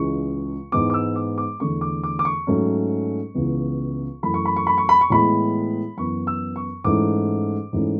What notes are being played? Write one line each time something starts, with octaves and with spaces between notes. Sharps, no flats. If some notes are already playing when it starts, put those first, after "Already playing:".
Already playing: C#2 C#3 E3 G#3 C#6
G#2 E3 G#3 B3 D6
D6
E6
D6
D6
E2 D3 A3 C#6
D6
D6
D6
C#6
G#2 F#3 A3 C#4
C#2 C#3 E3 B3
F#2 E3 A3 B5
C#6
B5
C#6
B5
C#6
B5
C#6
A2 E3 G#3 B3 B5
F#2 E3 B3 C#6
E6
C#6
G#2 E3 A3 C#4 D6
G#2 E3 A3 C#4